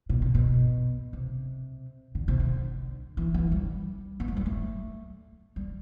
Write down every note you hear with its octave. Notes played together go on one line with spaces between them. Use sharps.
B2
C3
B2
C3
D3
C3
D3
E3
E3
G3
B3
A3
G3
A3
G3